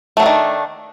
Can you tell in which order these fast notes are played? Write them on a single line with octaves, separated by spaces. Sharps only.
A3 F#3 D4 D#3